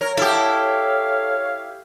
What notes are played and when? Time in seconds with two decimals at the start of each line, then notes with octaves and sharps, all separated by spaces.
0.01 A#4 C#5
0.17 E4 G4 A4 F5